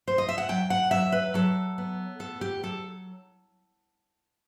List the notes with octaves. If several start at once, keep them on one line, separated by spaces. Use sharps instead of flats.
C5
D#5
E5
F#5
F#3 G5
F#5
F#3 E5
B4
F#3 A4
B3
A2 A4
G4
F#3 A4